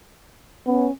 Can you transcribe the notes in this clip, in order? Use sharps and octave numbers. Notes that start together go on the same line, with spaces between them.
B3 C#4